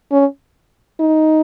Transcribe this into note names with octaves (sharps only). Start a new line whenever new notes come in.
C#4
D#4